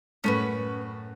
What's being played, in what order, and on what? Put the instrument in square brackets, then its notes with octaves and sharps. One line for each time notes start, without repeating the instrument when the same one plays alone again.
[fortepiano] F#2 A2 [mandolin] C#4 F#4 B4